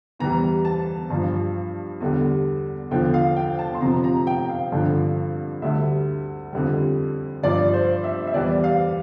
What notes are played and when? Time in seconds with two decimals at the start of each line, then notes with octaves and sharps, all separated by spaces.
0.19 E2 E3 G3 A#5
0.65 A5
1.10 G2 F3
2.00 E2 D3 G3
2.91 E2 D3 F3 G5
3.14 F5
3.36 G5
3.59 A5
3.74 C6
3.81 F2 C3 F3 A#5
4.04 A#5
4.27 G5
4.50 F5
4.72 G2 D3 F3
5.62 D2 D3 G3 E5
6.53 F2 D3 G3
7.43 G2 F3 D5
7.74 C5
8.04 E5
8.27 E5
8.34 E2 E3 G3 D5
8.64 F5